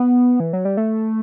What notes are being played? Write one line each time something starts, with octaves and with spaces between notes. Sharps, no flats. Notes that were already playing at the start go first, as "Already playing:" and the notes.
Already playing: B3
E3
F#3
G3
A3